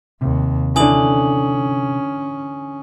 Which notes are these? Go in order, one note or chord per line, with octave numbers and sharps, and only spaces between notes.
D#2 C3
D3 E3 C#4 G#5 D#6 F#7